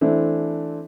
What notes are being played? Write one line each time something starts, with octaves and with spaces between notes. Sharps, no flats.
E3 A3 C4 D4 A4